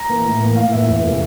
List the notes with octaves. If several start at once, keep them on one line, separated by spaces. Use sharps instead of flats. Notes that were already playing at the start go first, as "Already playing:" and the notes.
Already playing: A#5
E3 A#3
A2
E3 A#3
A2 F5
E3 A#3 E5
E2
C3 E3 A3